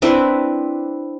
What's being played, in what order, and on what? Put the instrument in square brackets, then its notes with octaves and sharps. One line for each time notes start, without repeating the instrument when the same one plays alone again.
[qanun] C4 D4 E4 B4